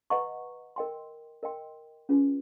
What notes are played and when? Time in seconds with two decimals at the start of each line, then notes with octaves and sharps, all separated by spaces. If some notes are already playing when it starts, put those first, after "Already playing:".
0.10 B4 D#5 F#5 A#5 C#6
0.76 A#4 D#5 G5 C6
1.43 A#4 D#5 G5 C6
2.09 C#4 F4 G#4 B4